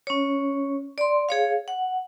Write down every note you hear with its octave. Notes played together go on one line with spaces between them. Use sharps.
C#4 C#5
D5 C6
G#4 C#5 F5
F#5